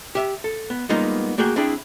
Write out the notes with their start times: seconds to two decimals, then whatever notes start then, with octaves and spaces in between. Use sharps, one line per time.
0.15 G4 E5
0.44 A4
0.70 B3
0.89 G3 G#3 A#3 B3 D#4 F4
1.38 A3 A#3 F#4 G#4 G5
1.56 C4 D4 E4 G#4 G5